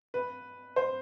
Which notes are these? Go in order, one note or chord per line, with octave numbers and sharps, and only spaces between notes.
B4
C5